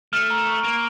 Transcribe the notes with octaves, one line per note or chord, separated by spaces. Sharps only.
A3 F6
A#5
C#6
A#3 D7